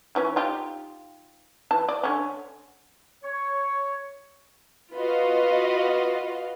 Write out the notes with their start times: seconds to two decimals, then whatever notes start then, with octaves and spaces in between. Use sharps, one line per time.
0.15 D#3 E3 C#4
0.36 D#4 F4 G4
1.71 E3 A5
1.88 D5
2.03 D3 C#4
3.24 C#5
4.94 F4 F#4 B4 D#5 F5